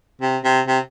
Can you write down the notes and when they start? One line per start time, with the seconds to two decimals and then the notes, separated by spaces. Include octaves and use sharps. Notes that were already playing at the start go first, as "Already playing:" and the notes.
0.21 C3
0.44 C3
0.68 C3